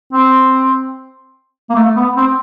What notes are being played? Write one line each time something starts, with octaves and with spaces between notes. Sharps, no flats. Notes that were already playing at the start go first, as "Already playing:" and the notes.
C4
A#3
A3
B3
C4